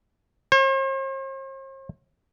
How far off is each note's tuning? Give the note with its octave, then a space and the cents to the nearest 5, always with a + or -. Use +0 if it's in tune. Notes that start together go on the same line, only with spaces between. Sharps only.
C5 +45